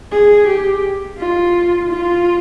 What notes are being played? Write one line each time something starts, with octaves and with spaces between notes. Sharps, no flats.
G#4
G4
F4
F4